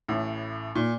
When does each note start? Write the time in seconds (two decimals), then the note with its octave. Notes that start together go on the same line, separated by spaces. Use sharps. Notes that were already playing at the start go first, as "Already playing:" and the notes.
0.08 A1 A2
0.75 A#2